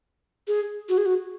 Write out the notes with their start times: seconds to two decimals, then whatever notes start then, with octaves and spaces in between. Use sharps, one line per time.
0.48 G#4
0.89 F#4
0.98 G#4
1.06 F#4